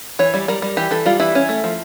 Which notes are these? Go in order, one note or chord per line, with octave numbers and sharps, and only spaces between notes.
E3 C#5
G3
G3 A#4
G3
E3 G4
E3 A4
G3 F4
E3 E4
C#4
A3
F3